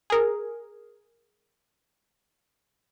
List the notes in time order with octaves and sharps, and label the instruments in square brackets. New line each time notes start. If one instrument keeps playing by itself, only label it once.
[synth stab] G#4 A#4